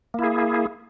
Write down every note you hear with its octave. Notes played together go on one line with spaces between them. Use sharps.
A#3 E4 G#4